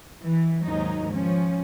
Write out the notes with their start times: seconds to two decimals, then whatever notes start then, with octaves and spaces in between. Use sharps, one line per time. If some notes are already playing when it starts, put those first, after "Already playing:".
0.21 E3
0.64 D#2 G#2 F#3 D#4
1.12 F3 C#4